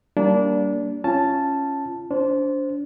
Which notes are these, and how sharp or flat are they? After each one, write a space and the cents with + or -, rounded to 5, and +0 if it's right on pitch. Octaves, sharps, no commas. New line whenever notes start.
G3 -15 A#3 +0 D4 -20
C#4 +0 F4 -25 A5 +0
D4 -30 C5 +0